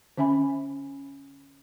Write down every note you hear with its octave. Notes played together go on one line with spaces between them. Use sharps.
D3 C#4 E5 G#5 B5